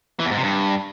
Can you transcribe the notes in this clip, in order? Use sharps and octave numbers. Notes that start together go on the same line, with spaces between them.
E3
E2
G#2
C3
G2